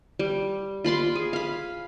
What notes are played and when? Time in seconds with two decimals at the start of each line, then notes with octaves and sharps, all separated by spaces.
0.19 G3
0.84 F4 B5 C6 D6
1.15 G#4
1.33 F5 B5